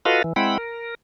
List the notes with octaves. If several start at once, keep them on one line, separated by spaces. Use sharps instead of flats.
F4 F#4 A4 B4 D#5 F5
E3
G#3 C4 E4 F#5 G5 B5
A#4